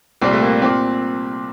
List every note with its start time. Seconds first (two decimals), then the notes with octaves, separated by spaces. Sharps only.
0.22 C2 A#2 G3 C4
0.33 A3
0.42 A#3
0.62 A#2 C4